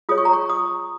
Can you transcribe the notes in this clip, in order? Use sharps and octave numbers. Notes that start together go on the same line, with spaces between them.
F4 G#4 C#5 D#6
C#6
A#5
C#6
D#6